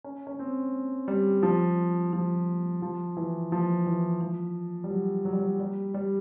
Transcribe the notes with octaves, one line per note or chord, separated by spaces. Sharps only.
C#4
C#4
C4
G3
F3
F3
F3
E3
F3
E3
F3
G3
F#3
F#3
G3
F#3
G3
G3